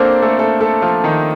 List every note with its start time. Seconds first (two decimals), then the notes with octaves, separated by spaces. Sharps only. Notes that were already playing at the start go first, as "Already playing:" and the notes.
Already playing: A#3 C4 D4 A4 A#4 C5
0.22 A3 A4
0.39 A3 A4
0.61 A3 A4
0.82 F3 F4
1.04 D#3 D#4